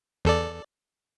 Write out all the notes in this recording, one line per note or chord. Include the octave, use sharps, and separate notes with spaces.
E2 A4 D5